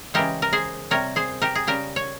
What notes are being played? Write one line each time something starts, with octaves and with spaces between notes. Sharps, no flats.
C#3 E3 G#3 G4 A#4
A#4
G#4 C5
C3 G3 A#4 C#5
G#4 C5
G4 A#4
G#4
C#3 G3 G4 A#4
C#5